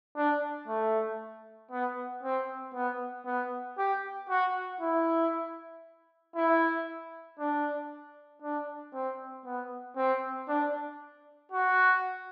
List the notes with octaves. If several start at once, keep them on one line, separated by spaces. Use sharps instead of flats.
D4
A3
B3
C4
B3
B3
G4
F#4
E4
E4
D4
D4
C4
B3
C4
D4
F#4